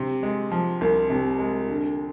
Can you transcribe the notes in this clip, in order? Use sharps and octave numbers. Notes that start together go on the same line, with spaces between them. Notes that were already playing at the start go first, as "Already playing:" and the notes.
Already playing: C3
G#3
F3
C2
C3
G#3
D3